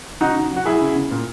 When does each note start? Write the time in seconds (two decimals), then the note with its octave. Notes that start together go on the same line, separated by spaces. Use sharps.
0.21 C#3 D#4 F#4
0.36 C#3
0.51 F#3
0.56 F#4
0.65 F#3 E4 G#4
0.81 C#3
0.96 C#3
1.11 A#2